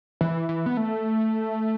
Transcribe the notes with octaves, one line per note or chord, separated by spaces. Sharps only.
E3
E3
B3
A3